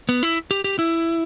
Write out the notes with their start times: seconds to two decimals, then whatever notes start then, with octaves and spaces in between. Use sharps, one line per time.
0.09 B3
0.23 E4
0.51 G4
0.64 G4
0.79 E4